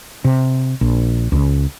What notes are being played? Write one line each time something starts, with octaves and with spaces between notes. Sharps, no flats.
C3
A#1
C#2